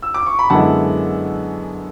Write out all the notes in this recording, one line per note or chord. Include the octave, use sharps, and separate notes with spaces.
E6
D6
C#6
B5
F#2 D3 G#3 B3 E4 F#5 A5